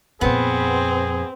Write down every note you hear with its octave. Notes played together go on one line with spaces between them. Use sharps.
F2 A#2 B3 C4 G#4